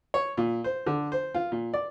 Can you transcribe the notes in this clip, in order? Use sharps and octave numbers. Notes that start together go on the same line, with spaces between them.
C#5
A#2
C5
D3
C5
F4
A#2
D5